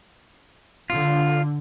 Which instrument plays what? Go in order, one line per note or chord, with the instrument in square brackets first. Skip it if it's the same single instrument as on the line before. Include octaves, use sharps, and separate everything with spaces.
[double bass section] D3 [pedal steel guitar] F4